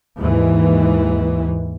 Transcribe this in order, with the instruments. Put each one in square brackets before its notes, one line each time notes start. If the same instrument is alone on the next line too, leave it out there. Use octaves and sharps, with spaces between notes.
[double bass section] D#2 G#2 E3